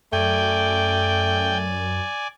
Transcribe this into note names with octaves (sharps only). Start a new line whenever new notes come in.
F#2 A3 D5 G5 G#5